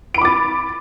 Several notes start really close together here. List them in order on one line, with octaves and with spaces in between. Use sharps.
D7 B5 D6 A6